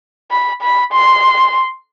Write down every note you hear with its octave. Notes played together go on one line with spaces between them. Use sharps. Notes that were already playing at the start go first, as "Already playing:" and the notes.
B5
B5
C6